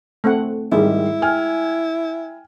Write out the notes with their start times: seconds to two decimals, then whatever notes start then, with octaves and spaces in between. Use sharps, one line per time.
0.24 A3 C4 F#5
0.72 G#2 D#3 G3 G#3 E4
1.22 G5 G#5 F6